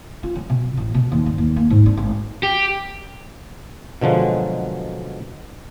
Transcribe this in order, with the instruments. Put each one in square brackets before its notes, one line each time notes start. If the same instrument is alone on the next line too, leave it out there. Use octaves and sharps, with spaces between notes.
[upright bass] F4
F#3
B2
A1
B2
D#2
G2
D#2
A#3
G#2
D4
G#1
[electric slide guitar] G4
[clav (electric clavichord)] B2 D3 F3 F#3 G#3